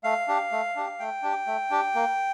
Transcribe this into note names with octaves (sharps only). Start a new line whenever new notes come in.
A3 F5
D4 G4
A3
D4 G4
A3 G5
D4 G4
A3
D4 G4
A#3